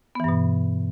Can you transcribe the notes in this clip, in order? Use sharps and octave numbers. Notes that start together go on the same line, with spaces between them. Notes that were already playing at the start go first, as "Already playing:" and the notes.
G2 B2 E3 B3